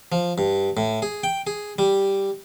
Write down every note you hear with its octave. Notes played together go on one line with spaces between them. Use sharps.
F3
G2
A2
G#4
G5
G#4
G3